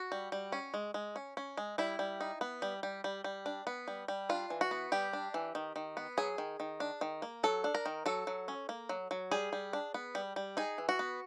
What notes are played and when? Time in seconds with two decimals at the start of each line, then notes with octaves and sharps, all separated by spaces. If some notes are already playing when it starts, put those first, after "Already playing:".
Already playing: F#4
0.12 G3
0.32 G3
0.52 C#4
0.74 G#3
0.94 G#3
1.16 C#4
1.37 C#4
1.57 G#3
1.78 G3 E4
1.99 G3
2.21 D#4
2.41 B3
2.62 G3
2.83 G3
3.04 G3
3.24 G3
3.46 D4
3.67 B3
3.88 G3
4.08 G3
4.29 D4 F4
4.50 E3
4.61 F#4
4.71 B3
4.92 G3 G4
5.13 D4
5.34 E3
5.55 D#3
5.76 D#3
5.97 B3
6.17 F#3 G#4
6.38 D#3
6.60 D#3
6.80 D4
7.01 D#3
7.22 A#3
7.43 F#3 A4
7.64 D4
7.75 A#4
7.86 D#3
8.06 F#3 A4
8.27 F#3
8.48 C#4
8.69 A#3
8.89 F#3
9.11 F#3
9.31 G3 G#4
9.53 G3
9.73 D4
9.94 B3
10.15 G3
10.36 G3
10.57 D#4 G#4
10.78 E3
10.89 F#4
10.99 B3